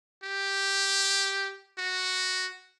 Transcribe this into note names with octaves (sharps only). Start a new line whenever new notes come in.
G4
F#4